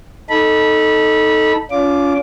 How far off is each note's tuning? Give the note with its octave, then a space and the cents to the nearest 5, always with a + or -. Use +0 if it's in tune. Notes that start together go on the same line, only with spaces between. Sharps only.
D#4 +0 A4 +0 B5 -25
C#4 +40 F4 +0 D6 +0